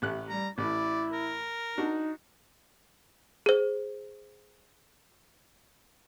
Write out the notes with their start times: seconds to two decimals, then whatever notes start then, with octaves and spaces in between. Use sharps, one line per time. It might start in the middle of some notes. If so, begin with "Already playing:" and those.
0.02 A1 A3 G4 F#6
0.29 G3 A#5
0.58 A1 E4 D5
1.12 A#4
1.78 D4 D#4 F#4
3.46 G#4 C5